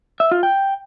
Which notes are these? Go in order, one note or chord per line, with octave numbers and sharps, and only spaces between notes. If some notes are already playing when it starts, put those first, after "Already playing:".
E5
F4
G5